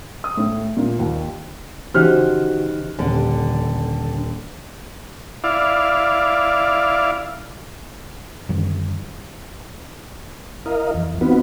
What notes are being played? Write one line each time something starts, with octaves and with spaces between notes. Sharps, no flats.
D#6
A2
A#2
D#2
C#3 E3 D#4 F#4 G4 C5 F6 F#6
D#1 D3
E4 D5 F5
F#2 D3 D#3 G3
E4 A#4 D#5 F5
F2 E3
B3 C4 D#4 F4 F#4 B4